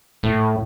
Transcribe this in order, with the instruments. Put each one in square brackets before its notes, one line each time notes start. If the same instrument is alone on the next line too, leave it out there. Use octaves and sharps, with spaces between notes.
[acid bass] A2